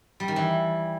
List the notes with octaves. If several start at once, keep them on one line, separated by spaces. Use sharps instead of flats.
G3
D#3
E3